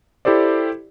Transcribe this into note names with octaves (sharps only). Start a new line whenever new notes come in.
E4 G4 A4 C5 D5